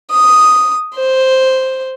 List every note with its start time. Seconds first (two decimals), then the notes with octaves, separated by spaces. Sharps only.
0.12 D#6
0.96 C5